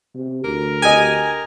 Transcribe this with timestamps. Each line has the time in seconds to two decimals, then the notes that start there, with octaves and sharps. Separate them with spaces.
0.15 C3
0.44 D2 A#4
0.82 G4 D#5 G#5